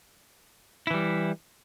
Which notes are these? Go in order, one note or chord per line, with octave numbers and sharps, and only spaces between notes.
E3 G3 E4